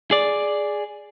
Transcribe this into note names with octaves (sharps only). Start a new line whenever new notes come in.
G#4 D5